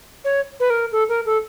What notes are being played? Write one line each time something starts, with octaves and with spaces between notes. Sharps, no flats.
C#5
B4
A#4
A4
A#4
A4